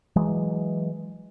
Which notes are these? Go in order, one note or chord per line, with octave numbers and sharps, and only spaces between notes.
E3 F#3 G#3